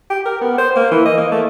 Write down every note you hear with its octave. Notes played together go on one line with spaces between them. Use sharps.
G4
A#4
B3
C5
A#3
E3
D#5
A#3
A3